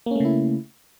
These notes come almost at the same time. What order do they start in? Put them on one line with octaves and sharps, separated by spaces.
A#3 C#4 A3 C#3 E4